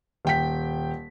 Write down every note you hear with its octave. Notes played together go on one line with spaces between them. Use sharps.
D#1 G5 B6